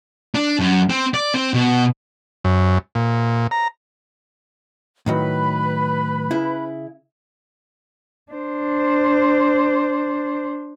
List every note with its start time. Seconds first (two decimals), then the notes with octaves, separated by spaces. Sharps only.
0.35 D4
0.60 F#2
0.90 C4
1.14 D5
1.34 C4
1.54 B2
2.45 F#2
2.95 A#2
3.51 A#5
5.06 A2 D#3 F#3 B4 B5
6.31 C#3 E4
8.32 D4 C5